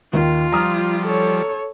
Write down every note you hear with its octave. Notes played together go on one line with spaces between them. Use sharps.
D#2 D#3 F4
F3 G3 A#5 D#6 F6
A4 C#5